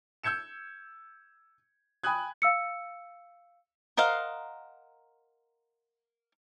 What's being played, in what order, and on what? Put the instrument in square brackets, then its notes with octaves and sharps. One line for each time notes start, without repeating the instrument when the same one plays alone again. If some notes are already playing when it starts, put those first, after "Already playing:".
[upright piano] E6 G6 G#6 C#7 E7
G5 G#5 B5 D#6 F#6 G#6
[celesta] F5 E6 C#7
[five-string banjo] A#4 C5 D#5 F5 F#5